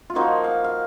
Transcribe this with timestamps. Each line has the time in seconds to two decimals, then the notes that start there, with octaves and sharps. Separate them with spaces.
0.10 F4
0.15 F3 A#3 D#4 F#4
0.44 F5
0.64 F5